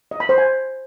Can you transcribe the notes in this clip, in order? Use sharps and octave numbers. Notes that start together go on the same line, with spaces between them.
D#5
B5
C5
G#5